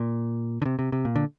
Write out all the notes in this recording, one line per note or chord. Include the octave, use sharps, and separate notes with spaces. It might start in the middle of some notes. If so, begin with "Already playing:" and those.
Already playing: A#2
D3
C3
C3
C3
A#2
D3